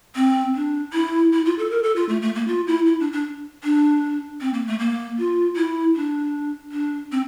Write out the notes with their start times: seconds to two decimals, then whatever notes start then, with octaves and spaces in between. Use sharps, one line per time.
0.16 C4
0.55 D4
0.93 E4
1.33 E4
1.46 F4
1.59 A4
1.71 A#4
1.83 A4
1.96 F4
2.09 A3
2.22 A3
2.35 A#3
2.48 F4
2.67 E4
2.86 E4
3.00 D4
3.13 D4
3.64 D4
4.41 C4
4.54 A#3
4.67 A3
4.79 A#3
5.19 F4
5.56 E4
5.96 D4
6.72 D4
7.12 C4